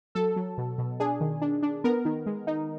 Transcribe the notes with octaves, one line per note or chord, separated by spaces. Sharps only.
F#3 A4
F#3
B2
B2
D4 G#4
D#3
D4
D4
B3 A#4
D#3
G#3
D#4